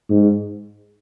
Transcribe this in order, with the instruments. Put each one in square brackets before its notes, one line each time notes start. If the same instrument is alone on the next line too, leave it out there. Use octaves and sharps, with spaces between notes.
[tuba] G#2